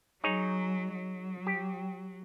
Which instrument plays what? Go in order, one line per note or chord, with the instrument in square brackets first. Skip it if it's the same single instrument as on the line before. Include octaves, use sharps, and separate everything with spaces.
[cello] F#3 [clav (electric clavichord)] D#4 G#4 C#5
[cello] F#3
[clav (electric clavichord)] G4